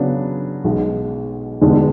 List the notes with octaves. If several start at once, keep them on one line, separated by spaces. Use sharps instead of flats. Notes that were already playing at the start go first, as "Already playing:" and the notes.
Already playing: C#3 F#3 B3 D4
B1 B2 G#3
E1 E2 D3 G#3